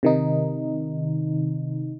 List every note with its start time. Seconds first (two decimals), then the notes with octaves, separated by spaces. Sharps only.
0.03 C3 D#3 D#4